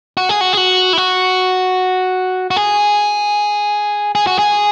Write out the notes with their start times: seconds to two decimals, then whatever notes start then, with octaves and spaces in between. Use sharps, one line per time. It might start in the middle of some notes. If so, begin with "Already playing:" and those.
0.17 F#4
0.29 G#4
0.41 F#4
0.53 G#4
0.57 F#4
0.93 E4
0.98 F#4
2.51 F#4
2.56 G#4
4.15 G#4
4.27 F#4
4.39 G#4